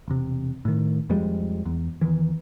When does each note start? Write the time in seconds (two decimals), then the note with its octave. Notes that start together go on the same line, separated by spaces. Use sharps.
0.08 E1 C3
0.65 A2 D#3
1.09 F2 F3 G3 G#3
1.65 E2
2.01 E2 C3 D#3 E3